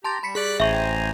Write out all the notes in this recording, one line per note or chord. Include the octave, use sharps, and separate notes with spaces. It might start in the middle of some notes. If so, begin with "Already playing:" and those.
G4 A5 A#5 C6 A6
G3 B5 B6 C#7
G#4 D5 F#6 B6
A1 C5 E5 G#5 A#5 C#6
G5